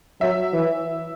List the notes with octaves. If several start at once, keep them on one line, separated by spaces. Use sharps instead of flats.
F#3 E5
E3